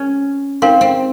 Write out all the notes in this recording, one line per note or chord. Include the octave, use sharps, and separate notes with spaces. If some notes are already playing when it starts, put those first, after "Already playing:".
Already playing: C#4
C4 D#4 A#4 F5 C6
C4